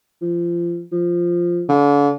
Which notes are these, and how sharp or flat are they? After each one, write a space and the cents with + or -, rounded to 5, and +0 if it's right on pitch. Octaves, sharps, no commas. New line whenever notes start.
F3 -25
F3 -5
D3 -40